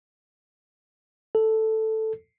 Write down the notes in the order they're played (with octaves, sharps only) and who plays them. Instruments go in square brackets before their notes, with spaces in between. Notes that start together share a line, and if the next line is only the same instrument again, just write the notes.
[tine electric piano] A4